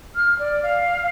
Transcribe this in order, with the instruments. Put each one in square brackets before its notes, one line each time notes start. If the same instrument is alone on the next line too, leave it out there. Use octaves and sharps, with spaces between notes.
[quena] F6
D5
F5